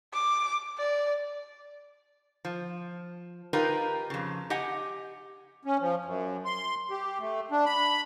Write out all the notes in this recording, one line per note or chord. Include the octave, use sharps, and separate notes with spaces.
D6
D5
F3
D#4 F4 G4 A#4 B4
F2 C#3
G4 D#5 F#5 G#5
C#4
F3
F#2
C6
G4
A3
D4
B5